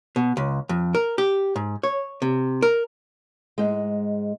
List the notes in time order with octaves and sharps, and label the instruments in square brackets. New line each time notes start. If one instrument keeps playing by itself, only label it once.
[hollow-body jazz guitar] B2
C#2
F2
A#4
G4
G#2
C#5
C3
A#4
[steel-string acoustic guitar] G#2 G#3